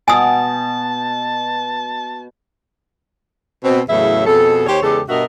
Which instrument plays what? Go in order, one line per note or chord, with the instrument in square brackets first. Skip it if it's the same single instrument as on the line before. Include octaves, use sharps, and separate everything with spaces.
[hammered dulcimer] B2 [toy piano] G#5 D#6 [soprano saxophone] A5
[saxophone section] B2 C4
E2 A2 C#3 F#3 E4 E5
F2 B2 G#4 A4
D#2 G4 C5 C#5
E2 C#3 G#3 G4 A4
G2 B2 F#4 A#4 D#5 E5